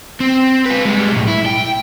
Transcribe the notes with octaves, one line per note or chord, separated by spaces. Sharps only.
C4
F4 B4
G3 G#3
B1 A2
E4
G5